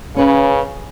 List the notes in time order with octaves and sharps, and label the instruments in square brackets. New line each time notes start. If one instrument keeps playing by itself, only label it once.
[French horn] C#3 [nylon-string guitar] C#4 B4